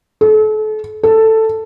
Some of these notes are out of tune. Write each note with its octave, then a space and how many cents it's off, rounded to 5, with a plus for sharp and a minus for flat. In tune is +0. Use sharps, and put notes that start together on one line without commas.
A4 -35
A4 +10